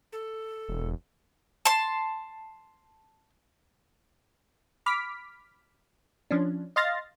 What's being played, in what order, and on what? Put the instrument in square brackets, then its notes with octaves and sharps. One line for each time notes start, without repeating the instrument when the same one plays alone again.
[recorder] A4
[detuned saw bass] E1
[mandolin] A5 C6
[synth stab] B5 D6 F6 B6
F3 C#4 D4
D#5 F5 C6 F6 A6 A#6